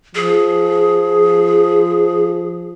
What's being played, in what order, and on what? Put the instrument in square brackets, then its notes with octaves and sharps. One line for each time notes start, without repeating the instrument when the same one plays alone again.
[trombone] F3 [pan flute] G#4